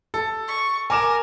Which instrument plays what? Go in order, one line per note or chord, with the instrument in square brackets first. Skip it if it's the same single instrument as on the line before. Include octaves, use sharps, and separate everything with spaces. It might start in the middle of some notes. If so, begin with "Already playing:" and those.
[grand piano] A4
[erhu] C#6
[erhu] A#4 [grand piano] G#5 D6 E7